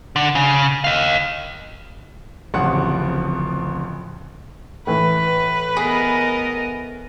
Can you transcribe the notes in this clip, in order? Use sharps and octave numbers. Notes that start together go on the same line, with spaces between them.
D3
C#3
D#5 F5
D1 A1 F2 C#3 F#5
A2 E3 B4
B3 G#4 A#4 D#5